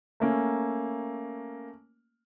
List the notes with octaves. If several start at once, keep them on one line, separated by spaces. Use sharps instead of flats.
A3 A#3 C#4